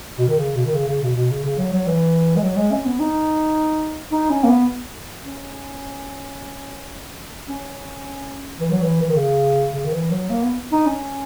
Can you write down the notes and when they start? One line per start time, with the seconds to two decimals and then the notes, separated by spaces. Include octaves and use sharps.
0.18 B2
0.28 D#3
0.38 C#3
0.55 B2
0.65 D#3
0.75 C#3
0.88 C#3
1.03 B2
1.16 B2
1.30 C#3
1.44 C#3
1.58 F#3
1.73 F#3
1.87 E3
2.37 G#3
2.43 F#3
2.57 G#3
2.72 C#4
2.86 B3
3.00 D#4
4.12 D#4
4.30 C#4
4.44 A#3
4.49 B3
5.24 C#4
7.49 C#4
8.60 E3
8.71 F#3
8.82 E3
9.02 E3
9.09 D#3
9.17 C#3
9.74 C#3
9.85 D#3
9.93 E3
10.11 F#3
10.30 A#3
10.43 B3
10.72 D#4
10.86 C#4